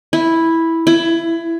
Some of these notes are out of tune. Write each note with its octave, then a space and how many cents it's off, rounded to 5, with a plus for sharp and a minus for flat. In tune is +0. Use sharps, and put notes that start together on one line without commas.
E4 -5
E4 +20